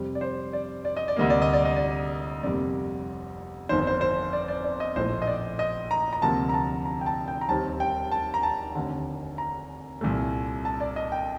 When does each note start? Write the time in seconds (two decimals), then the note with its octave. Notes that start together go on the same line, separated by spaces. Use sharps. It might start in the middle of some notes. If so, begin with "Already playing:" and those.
Already playing: F2 C3 G3
0.15 D5
0.21 C5
0.53 D5
0.85 D5
0.97 D#5
1.08 D5
1.16 D2 C3 G3 A#3 D#5
1.30 D5
1.42 D#5
1.53 D5
1.65 D#5
1.76 D5
2.43 G1 F2 C3 G3 A#3 D5
3.69 G1 F2 D#3 C5
3.87 C5
4.01 C5
4.33 D5
4.48 D5
4.64 D5
4.80 D#5
4.96 A#1 A2 F3 A3 C5
5.22 D#5
5.27 D5
5.59 D#5
5.91 A#5
6.13 A#5
6.22 D2 C3 F3 A#3 A5
6.49 A#5
6.54 A5
6.86 A#5
7.01 G5
7.06 A5
7.28 G5
7.41 A#5
7.49 D#2 D#3 G3 C4 A5
7.80 G5
8.11 A5
8.34 A#5
8.43 A5
8.75 F1 D#2 D3
9.38 A#5
10.01 C2 A#2 A3
10.65 A5
10.80 D5
10.96 D#5
11.12 G5